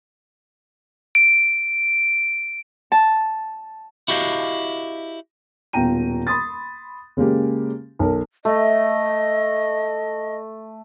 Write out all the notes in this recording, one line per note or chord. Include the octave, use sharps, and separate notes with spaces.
D7
A5
E4 F#4 G4 D#5 F5
D#1 B2 F4 G5 A#5 D#7
B5 C6 D#6 A6
C#3 G#3 A#3 G4
B1 A#4
A3 D#5